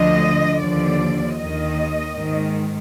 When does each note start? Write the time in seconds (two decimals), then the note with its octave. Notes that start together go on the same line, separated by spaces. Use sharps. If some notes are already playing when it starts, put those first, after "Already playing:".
Already playing: D2 D3 F3 D#5
0.59 D#2 D3 F3 D5
1.37 D#2 D#3 D#5
2.15 G#2 D#3